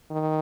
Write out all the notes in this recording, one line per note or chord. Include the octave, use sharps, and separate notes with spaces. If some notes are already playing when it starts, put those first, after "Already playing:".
D#3